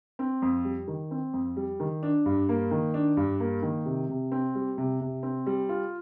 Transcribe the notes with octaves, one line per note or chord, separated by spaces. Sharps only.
C4
F2
G3
D#3
C4
F2
G3
D#3
D4
G2
A#3
D#3
D4
G2
A#3
D#3
C3
C3
C4
G3
C3
C3
C4
G3
F4